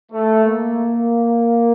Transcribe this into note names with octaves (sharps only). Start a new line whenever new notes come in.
A3
A#3